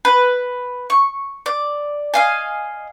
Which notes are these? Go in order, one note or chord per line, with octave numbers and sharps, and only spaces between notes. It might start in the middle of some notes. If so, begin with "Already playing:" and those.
B4
C#6
D5
D#5 F5 G#5